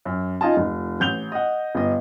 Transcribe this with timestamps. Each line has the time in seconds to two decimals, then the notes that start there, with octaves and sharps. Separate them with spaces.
0.05 F#2
0.41 D#4 F4 D#5 G#5 A5
0.57 F1
1.00 A1 G6 F7 G7
1.32 D#5 F#5
1.75 G1 D#5